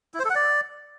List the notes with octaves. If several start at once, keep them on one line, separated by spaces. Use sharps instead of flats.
E4
C5
A4
F#5
D5